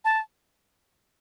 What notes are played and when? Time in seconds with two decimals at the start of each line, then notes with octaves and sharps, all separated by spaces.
0.05 A5